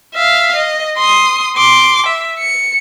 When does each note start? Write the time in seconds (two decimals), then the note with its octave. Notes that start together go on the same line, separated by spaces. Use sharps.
0.14 E5 F5
0.56 D#5
0.97 C6 D#6
1.57 C6 D6
2.06 E5
2.39 C#7